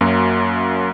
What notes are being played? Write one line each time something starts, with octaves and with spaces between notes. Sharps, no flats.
F#2 F#3 A#3